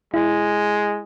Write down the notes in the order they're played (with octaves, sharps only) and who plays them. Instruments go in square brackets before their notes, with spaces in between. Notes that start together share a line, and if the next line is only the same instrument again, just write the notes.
[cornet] G#3 [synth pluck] E4